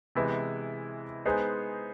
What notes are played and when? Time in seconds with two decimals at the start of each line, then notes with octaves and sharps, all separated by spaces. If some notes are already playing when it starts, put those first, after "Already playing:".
0.15 C3 E3 G#3 B3 E4
1.25 G#3 B3 D#4 G#4 C5